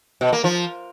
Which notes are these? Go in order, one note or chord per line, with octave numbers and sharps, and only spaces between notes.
B2
A#3
F3